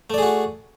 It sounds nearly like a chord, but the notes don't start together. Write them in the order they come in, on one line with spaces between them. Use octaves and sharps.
A3 D5 G#4 F#4